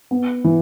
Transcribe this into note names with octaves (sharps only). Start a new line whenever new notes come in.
B3
E3